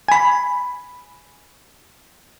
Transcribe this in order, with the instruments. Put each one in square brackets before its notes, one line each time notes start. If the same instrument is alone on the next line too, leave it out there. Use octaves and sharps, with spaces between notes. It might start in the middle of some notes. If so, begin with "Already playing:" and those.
[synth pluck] G#5 B5